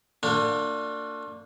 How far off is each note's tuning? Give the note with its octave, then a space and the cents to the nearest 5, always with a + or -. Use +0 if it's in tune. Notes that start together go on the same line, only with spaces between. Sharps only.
A#3 -40 D4 +0 F4 +40